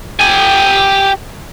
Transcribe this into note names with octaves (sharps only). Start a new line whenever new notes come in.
G4 G#5